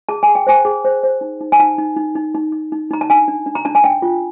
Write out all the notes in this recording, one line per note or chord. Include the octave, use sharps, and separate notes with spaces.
G#4 A5
G#5
G#4
G5
C5 G#5
G#4
C5
C5
D#4
D#4
G#5
D#4 A5
D#4
D#4
D#4
D#4
D#4
D#4
D#4 A#5
A5
D4 G#5
D4
D4
A#5
D4 A5
G#5
D4 G5
F4